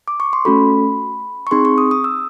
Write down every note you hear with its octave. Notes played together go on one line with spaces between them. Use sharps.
D6
C#6
C6
A3 C#4 F#4 A4 B5
C#6
C4 D#4 G#4 C6
C#6
D#6
D#6
E6